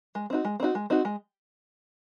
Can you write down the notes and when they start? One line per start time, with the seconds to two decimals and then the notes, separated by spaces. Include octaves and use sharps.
0.15 G#3
0.30 C4 D#4 F#4
0.45 G#3
0.60 C4 D#4 F#4
0.75 G#3
0.90 C4 D#4 F#4
1.05 G#3